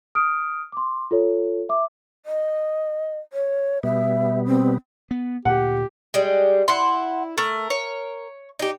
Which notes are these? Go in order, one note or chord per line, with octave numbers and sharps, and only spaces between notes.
D#6 F6 D7
C6 D6
F4 A4 C#5
E5 D6
D#5
C#5
B2 G3 B3 E5
C4
B3
D2 A#2 G4 F#5
G3 G#3
E4 F#5 C6
A3 A#4
C#5
D#4 G4